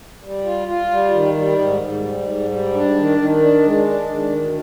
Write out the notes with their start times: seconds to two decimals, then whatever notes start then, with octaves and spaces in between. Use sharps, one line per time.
0.23 G3
0.45 F4
0.68 F4
0.91 G3
1.14 D#3
1.37 G3
1.59 G#2
1.82 G#2
2.05 G3
2.28 G#2
2.50 G3
2.74 D4
2.96 D#3
3.18 D#3
3.42 D4
3.65 G#3
3.86 D4
4.09 D#3
4.32 D2